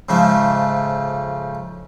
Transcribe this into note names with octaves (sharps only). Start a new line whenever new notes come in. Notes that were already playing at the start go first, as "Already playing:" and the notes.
G#2 C#3 F3 A3